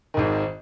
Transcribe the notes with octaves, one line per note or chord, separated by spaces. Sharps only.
G#1 G#2 D#3